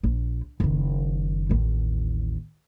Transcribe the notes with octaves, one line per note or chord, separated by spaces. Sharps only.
A#1
F#1 D#3
A1 D#2